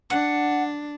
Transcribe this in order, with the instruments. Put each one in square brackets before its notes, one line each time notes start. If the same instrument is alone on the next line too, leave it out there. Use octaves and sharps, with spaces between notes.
[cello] D4 [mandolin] F#5